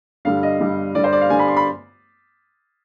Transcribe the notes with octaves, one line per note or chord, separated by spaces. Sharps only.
G2 D3 G3 F5
D#5
G2 D3 G3
G2 D3 G3 D5
C5
D5
F5
G2 D3 G3 G#5
B5
C6
B5